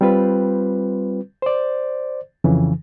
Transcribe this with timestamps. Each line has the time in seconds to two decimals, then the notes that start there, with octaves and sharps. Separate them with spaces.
0.01 G3 C4 F4 B4
1.42 C5 D5
2.44 F2 C#3 E3